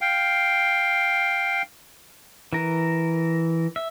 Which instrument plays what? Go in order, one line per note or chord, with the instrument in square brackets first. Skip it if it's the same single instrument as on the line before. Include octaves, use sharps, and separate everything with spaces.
[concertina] F5 G5
[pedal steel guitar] E3 A#4
E5